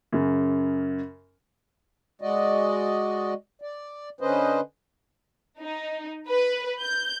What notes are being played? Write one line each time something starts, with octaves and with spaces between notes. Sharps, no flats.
F#2 C#3
G#3 F#4 D5 D#5
D5
D3 C#4 B4 C5 D#5
D#4
B4
G6